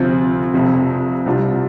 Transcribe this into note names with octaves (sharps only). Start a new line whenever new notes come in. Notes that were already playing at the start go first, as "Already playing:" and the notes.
Already playing: D2 C3 F3 C4 F4
F1 F2 C3 F3
C2 C3 G3 D4 F4